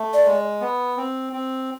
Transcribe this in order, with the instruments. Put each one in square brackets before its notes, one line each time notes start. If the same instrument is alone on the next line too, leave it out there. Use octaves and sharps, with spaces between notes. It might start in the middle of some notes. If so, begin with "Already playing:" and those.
Already playing: [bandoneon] A3
[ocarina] D5
[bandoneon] G#3
B3
C4
C4